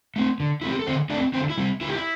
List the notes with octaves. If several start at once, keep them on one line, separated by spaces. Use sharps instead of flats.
A3 C4
D3
A3 C4 E4
G4
A4
D3 C4 C5
A3 C4 D4 D5
D3 C4 C5
E4
G3 C4
D3 E4
G4
E4